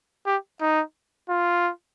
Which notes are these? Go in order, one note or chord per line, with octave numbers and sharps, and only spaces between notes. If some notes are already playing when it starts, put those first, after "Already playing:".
G4
D#4
F4